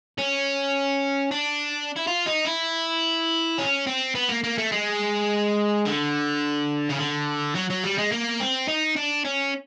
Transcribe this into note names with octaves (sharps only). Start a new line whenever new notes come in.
C#4
D4
E4
F4
D#4
E4
C#4
C4
B3
A#3
A#3
A3
G#3
D3
C#3
D3
F#3
F#3
G3
G#3
A#3
C4
D#4
D4
C#4